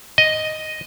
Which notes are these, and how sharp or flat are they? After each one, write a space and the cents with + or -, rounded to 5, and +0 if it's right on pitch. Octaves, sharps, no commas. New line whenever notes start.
D#5 +0